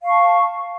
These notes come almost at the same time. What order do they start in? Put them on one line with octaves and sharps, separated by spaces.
F5 C#6 A5